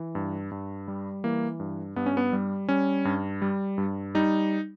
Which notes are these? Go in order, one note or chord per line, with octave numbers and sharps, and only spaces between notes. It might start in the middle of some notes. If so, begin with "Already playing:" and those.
Already playing: E3
G2
G2
G3
E3 A#3
G2
G2 B3
C#4
B3
G3
G3 C#4
G2
G3
G2
G3 D#4